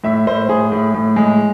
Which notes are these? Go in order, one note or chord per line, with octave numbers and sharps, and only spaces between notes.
A2 E5
A2 C5
A2 G#4
A2
A2
G#3